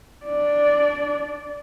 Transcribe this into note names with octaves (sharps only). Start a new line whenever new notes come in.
D4 D5